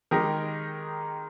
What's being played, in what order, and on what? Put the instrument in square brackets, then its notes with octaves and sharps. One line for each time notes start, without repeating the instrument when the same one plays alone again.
[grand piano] D#3 G#3 D#4 G4 A#4